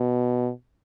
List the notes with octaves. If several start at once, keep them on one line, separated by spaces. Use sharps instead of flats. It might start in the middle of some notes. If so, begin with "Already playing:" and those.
Already playing: B2